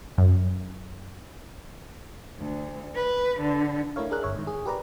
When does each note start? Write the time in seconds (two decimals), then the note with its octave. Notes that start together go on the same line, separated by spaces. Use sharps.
0.18 F#2
2.39 D2
2.95 B4
3.41 D3
3.96 A3 D4 E4 A#4 C#5 F5
4.11 D4 G#4 A#4 F#6
4.23 G1 C#5 E5
4.36 G#2 D#3
4.47 G#4
4.65 G4 A#4 B4 D5 A#5